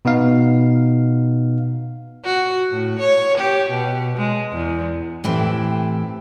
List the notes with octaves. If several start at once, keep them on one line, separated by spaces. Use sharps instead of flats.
B2 B3 D#4 F5
F#4
A2
C#5
G4
B2
G#3
E2
A2 E3 C4 E4 G4